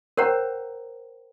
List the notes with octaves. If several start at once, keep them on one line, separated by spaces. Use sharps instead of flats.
A#4 C5 C#5 F#5 G5 A#5